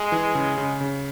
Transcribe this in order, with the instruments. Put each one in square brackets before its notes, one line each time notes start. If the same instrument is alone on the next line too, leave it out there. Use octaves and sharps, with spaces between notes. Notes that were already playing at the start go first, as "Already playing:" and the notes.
Already playing: [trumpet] G#3
[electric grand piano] E3
C#3
C#3
C#3